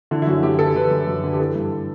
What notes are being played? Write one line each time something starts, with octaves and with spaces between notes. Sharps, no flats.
D3 E4
E4
F#2 F#4
F#2 G4
D3 A4
D3 B4
F#2
F#2
D3
G4
E3 A4
G2